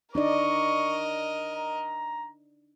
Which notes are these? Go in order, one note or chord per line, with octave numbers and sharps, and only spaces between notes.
D4 D#4 A#4 D5 D#5 C#6
A#5